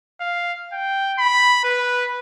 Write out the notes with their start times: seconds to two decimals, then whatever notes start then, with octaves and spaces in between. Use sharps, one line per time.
0.21 F5
0.73 G5
1.19 B5
1.64 B4